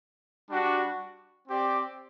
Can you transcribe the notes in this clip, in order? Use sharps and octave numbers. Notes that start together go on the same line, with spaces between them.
G3 D4 F#4
C4 G4 D5